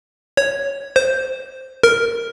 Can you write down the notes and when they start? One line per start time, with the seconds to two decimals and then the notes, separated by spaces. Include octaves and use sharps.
0.37 C#5
0.96 C5
1.83 A#4